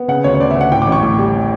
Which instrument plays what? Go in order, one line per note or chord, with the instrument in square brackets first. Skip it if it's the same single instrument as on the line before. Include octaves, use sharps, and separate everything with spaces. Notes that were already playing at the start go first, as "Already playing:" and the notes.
Already playing: [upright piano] B3
C#3 F#5
D2 C#5
C#5
D2 D5
E5
D2
F#5
A2 G5
D6
A1
C#6
A2
G3